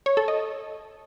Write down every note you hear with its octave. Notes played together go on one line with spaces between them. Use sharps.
C#5
A4
D#5